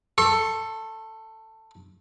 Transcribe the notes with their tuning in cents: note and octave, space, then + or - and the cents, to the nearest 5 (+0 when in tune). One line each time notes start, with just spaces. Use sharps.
A4 +10 C#6 -40